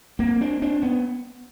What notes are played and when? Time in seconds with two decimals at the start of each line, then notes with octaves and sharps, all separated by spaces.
0.19 A#3 C4
0.41 C4 D4
0.62 C4 D4
0.82 B3 C#4